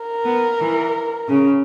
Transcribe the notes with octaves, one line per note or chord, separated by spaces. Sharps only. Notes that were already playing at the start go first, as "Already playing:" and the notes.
Already playing: A#4
B3
E3
C#3